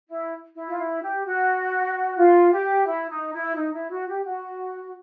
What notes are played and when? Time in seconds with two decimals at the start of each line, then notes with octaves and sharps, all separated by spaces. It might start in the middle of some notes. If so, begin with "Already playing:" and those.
0.09 E4
0.55 E4
0.68 F4
0.78 E4
1.02 G4
1.25 F#4
2.17 F4
2.52 G4
2.86 E4
3.10 D#4
3.33 E4
3.55 D#4
3.73 E4
3.91 F#4
4.08 G4
4.25 F#4